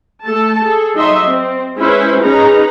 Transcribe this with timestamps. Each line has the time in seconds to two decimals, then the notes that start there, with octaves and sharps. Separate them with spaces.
0.25 A3 A4 A5
0.64 G#4 A4
0.95 F#3 D#4 D#5 E5 C6
1.27 C4
1.77 G#3 C#4 E4 B4 C5
2.22 C#4 D#4 G#4 B4 A#5